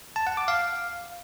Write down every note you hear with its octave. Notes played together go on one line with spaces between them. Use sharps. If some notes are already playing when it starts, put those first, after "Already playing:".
A5
F#5
D6
F5